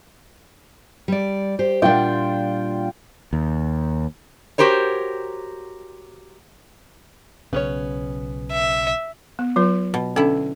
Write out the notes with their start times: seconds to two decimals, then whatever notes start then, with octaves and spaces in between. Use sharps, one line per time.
1.08 G3 D5
1.59 G4 C5
1.82 A#2 G3 D4 F4 F#5 G5
3.33 D#2
4.58 F#4 G4 A#4 C5 C#5
7.53 B1 C#3 B3 C#4 C#5
8.52 E5
9.39 B3
9.56 F#3 F4 B4
9.94 B2
10.16 D3 C#4 E4